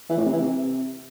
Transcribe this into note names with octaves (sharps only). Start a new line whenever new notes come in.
E3
A2
C3
E3
C3